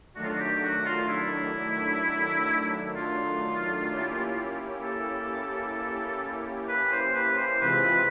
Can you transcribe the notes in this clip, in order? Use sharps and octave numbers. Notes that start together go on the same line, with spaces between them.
D#3 F#3 A3 D4 F#4
F4
F#4
G4
F#4
F4
E4
F4
A#3 C#4 E4 G4
A4
B4
C5
B4
C5
C3 E3 G#3 C4 F4 B4